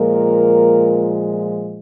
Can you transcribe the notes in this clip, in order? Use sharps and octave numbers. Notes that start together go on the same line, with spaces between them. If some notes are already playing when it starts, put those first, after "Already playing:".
Already playing: A#2 F3 G#3 A#3 A#4